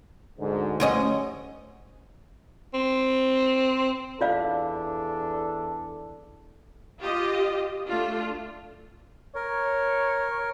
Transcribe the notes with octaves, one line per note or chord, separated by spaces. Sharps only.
D2 G#2 D3
D2 G2 F3 C#4 D#5 F#5
C4
E2 D4 F4 A4 D5 F5
F4 G4 D#5
A3 D4 F4
A#4 C#5